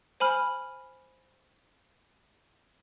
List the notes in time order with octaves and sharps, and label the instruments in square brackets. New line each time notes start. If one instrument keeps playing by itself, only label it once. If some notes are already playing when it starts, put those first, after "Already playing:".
[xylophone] C5 G#5 B5 F6